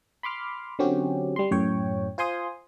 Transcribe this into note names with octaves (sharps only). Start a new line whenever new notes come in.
B5 C6 D6 F6
D3 F#3 C4 C#4 F#4 G4
G3 C6
F#2 A2 C#5 G5
F4 C5 G#5 C6 D#6